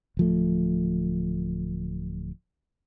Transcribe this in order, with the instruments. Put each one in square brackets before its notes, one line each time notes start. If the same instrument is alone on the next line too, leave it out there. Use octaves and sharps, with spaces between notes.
[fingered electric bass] D1 F3 A3